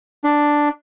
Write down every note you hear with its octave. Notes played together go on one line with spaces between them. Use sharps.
D4